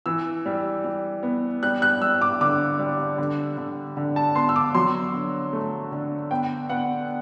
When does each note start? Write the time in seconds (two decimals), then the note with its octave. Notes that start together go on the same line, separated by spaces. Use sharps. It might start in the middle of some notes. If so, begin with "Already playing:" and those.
0.06 E3 E6
0.46 G3
0.85 G3
1.23 B3
1.63 G3 F#6
1.82 F#6
2.02 G3 E6
2.22 D6
2.41 D3 D6
2.79 G3
3.18 D3
3.58 D3
3.97 D3
4.16 A5
4.35 B3 C6
4.49 E6
4.56 D6
4.75 F#3 C6
5.14 D3
5.53 A3
5.92 D3
6.31 B3 G5
6.69 B3 F#5